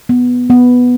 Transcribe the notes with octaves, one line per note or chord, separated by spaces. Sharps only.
B3
B3